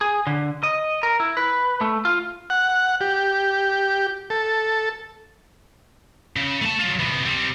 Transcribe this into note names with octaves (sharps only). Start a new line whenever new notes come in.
G#4
D3
D#5
A#4
E4
B4
A3
F4
F#5
G4
A4
C#3
A3 A5
F#3 F4
C3 B3
G3 C4